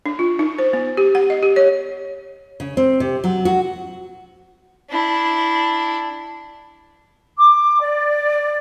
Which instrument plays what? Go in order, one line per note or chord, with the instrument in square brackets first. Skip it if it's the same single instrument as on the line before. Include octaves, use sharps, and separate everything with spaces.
[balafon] D4
F4
D#4
C5
B3
G4
F#5
D#5
G4
C#5
[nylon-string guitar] C#3
C4
C3
F#3
F#4
[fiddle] D4 E4
[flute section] D6
D5